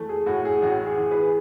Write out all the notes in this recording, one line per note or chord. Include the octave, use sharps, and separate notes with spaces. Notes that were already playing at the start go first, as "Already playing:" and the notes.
Already playing: E3 A3
G#4
A2 F#4
G#4
A1 F#4
G#4
E3
G#4 B4